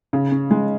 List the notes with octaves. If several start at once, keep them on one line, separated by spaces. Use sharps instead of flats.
C#3
C#4
G#3